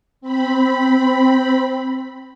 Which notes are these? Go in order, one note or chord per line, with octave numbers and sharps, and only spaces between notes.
C4 B5